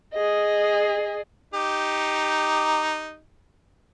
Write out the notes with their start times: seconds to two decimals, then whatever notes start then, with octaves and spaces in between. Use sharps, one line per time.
0.14 G#4 D#5
1.54 D#4 G4